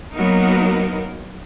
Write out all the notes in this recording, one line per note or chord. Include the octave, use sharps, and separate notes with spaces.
F#3 A#3 B3 D#4 A#4